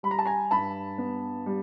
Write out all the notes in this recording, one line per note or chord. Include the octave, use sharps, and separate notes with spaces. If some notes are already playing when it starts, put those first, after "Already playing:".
G3 B5
A#5
A5
G#5 A#5
G2 A5 B5
B3
G3